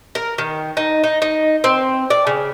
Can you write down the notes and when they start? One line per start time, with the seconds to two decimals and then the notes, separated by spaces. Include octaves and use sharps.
0.15 A#4
0.38 D#3
0.77 D#4
1.04 D#4
1.22 D#4
1.64 C4
2.10 D5
2.27 C#3